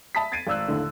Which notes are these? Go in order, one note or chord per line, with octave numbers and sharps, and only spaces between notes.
E5 A5 B5 D#6 B6
G#6 A6 C7 D7 D#7
G#1 D5 E6 F#6
D#2 A2 D3